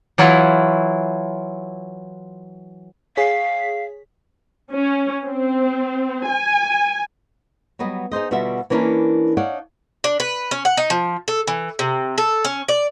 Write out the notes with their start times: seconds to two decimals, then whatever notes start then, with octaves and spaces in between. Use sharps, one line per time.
0.18 E3 F#3 E4 F4 F#5
3.17 G#4 C#5 F5 B6
4.73 C#4
5.25 C4
6.28 G#5
7.79 F#3 G3 B3 D#5
8.12 D#4 G#4 C5 D#5
8.31 B2 D3 G3 F4 F#4 E5
8.70 E3 A#3 C#4 D4 E4 A#4
9.37 D4 D#4 C#5 D5 F5 F#5
10.04 D4
10.20 B4
10.51 C#4
10.65 F#5
10.77 D#4
10.90 F3
11.28 A4
11.47 E3
11.79 C3
12.18 A4
12.45 C#4
12.68 D5